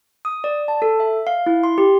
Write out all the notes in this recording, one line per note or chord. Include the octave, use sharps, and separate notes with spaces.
D#6
D5
A5
A4
E5
F5
E4
C6
G4